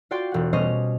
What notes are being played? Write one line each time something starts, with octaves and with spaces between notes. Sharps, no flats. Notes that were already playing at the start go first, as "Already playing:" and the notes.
F4 F#4 D5 G5 C6 A6
E1 F#5
B2 G3 C#4 C5 D#5 F6